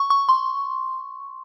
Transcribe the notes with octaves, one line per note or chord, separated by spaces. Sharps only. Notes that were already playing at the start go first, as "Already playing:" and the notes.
Already playing: C#6
C#6
C6